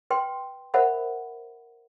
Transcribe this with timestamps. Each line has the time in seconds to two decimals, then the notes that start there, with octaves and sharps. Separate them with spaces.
0.10 B4 G5 C6
0.74 A#4 C5 E5 F#5 B5